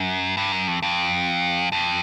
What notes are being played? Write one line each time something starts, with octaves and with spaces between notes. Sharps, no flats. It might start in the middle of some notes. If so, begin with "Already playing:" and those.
Already playing: F#2
G2
F#2
F2
F2
F2